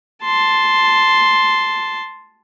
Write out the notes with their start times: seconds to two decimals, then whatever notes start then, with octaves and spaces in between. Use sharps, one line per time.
0.24 A5 C6